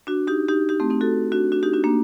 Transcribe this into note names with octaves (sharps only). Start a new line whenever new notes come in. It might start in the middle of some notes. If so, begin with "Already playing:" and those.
D4 F#4
D#4 G4
D#4 G4
D#4 G4
A3 C4
C4 D#4
F#4 A4
D4 F#4
D4 F#4
D#4 G4
D4 F#4
A#3 D4